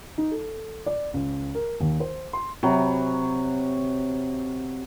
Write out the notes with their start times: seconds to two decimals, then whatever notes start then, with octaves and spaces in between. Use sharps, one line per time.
0.18 D#4
0.31 A4
0.86 D5
1.14 C#2
1.55 A#4
1.80 D#2
2.00 C5
2.33 C6
2.63 C3 F#3 B5